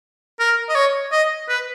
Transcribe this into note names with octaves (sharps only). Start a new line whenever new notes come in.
A#4
D#5
C#5
D#5
B4